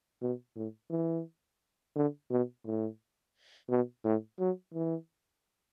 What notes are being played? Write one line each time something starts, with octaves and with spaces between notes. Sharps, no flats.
B2
A2
E3
D3
B2
A2
B2
A2
F#3
E3